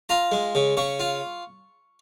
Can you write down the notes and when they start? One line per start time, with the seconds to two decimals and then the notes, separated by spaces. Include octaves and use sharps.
0.09 F4 A#5
0.32 G#3
0.55 C#3
0.77 C#3 C#6
1.00 F4